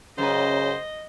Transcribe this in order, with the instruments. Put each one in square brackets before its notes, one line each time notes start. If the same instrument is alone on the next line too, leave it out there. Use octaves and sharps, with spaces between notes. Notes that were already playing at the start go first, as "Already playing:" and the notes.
[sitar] F#2 B4 [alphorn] C#3 [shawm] C5 [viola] D#5